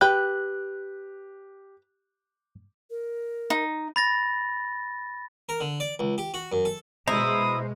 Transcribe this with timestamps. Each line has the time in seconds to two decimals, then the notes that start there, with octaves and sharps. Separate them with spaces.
0.01 G4 B4 G5 F#6
2.90 A#4
3.50 D#4
3.96 B5 A6 A#6
5.49 A#4
5.60 D3
5.80 D5
5.99 C#2
6.18 G4
6.34 F#4
6.52 F#2
6.65 A4
7.08 B2 G#3 E4 C5 A#5 D#6